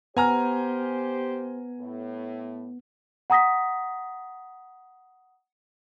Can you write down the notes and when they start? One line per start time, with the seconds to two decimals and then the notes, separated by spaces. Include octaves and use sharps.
0.17 B3 G4 C5 G#5 A#5 F6
1.80 A2
3.30 F#5 A#5 D#6 A#6 B6